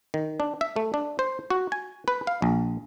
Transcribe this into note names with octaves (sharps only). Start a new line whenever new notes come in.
D#3
D4
E5
A3
D4
C5
F#4
G#5
B4
F5
A#1